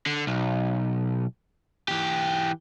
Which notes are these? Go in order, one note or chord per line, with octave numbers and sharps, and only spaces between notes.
D3
B1
E3 G4